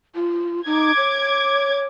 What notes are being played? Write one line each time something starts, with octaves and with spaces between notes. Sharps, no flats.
F4
D#4 D6 G#6
C#5